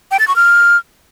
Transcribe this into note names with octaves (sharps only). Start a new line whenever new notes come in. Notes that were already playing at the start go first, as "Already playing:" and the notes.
G5
A6
C#6
F6